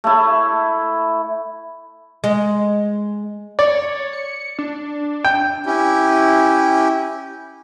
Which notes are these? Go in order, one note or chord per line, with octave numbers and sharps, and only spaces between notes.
A3 E4
G#3
C#5 D5
C#7
D4
G5
C#4 E4 G4